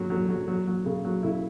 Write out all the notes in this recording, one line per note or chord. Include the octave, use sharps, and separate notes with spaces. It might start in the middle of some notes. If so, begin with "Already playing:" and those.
Already playing: F#2 F#3
F#3
F#3
F#3
F#3
C#3
F#3
C#3 E4